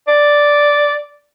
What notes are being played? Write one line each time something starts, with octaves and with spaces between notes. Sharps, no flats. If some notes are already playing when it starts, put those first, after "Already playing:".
D5